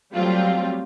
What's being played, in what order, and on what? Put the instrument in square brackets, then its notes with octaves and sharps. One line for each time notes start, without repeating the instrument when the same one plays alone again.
[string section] F#3 G3 A3 C4 F4 G4